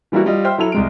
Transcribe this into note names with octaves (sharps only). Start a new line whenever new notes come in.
E3 G3 A#3 E4 F#4
G3 F4 D#5
C5 E5 G5 C6 F6
F#3 E4 A4 F7
C2 G#3 D7